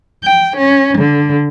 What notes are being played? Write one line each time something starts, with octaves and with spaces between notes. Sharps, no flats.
G5
C#4
D3